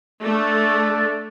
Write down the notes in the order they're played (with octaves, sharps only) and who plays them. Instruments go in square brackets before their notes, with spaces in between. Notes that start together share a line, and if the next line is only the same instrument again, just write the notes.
[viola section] A3 [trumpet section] D4 A4 D5